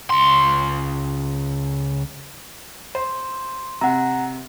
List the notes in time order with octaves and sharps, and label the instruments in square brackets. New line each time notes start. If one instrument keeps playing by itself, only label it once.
[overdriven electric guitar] C#2 C6
[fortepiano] C5
[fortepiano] C3 [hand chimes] F#5 A#5